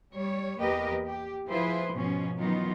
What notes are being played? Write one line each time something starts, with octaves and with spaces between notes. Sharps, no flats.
G3 C#5
E2 A#3 G4 A#4 B4 D#5
G4
F3 E4 F4 G#4 B4 C5
G#2 B2 F3 C#4
D#3 E3 F#3 B3 D#4 F4